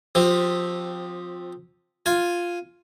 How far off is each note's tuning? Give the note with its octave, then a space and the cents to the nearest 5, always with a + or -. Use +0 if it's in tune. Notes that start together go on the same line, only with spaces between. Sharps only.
F3 +25 C4 +0 G4 +0
F4 +0 G#5 +0